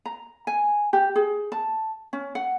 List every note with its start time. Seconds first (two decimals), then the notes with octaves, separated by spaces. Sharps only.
0.06 A#5
0.47 G#5
0.93 G4
1.16 G#4
1.52 A5
2.13 C#4
2.35 F#5